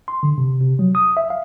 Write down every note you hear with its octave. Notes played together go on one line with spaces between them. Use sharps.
C6
D3
C3
C3
F#3
D#6
E5
F5